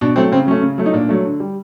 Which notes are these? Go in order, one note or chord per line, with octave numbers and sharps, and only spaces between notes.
B2 D4
F#3 A3 C4
C#3 C4
F#3 A3 C#4
C#3
F#3 A3
D#4
A#2 D4
F#3 A3
D3
G3